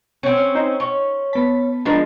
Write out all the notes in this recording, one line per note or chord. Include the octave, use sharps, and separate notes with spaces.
C4 C#4
C#5 F6
D#4 C5
C#4
B3 A5 B6
F3 G#3 B3 D4 A#4